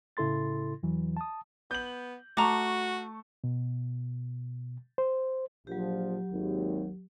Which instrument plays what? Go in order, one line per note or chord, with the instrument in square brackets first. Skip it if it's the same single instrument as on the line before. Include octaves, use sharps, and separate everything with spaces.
[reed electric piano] A2 C#3 E4 A4 C6 A6
E2 E3 F#3
A5 D#6
[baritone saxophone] B3 [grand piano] G6 F#7
[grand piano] A3 A5 C#6 [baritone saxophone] F#4 [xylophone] A#5 D6
[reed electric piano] B2
C5
[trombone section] A#1 A#2 F3 [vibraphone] F#3 G4
[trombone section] G#1 D#2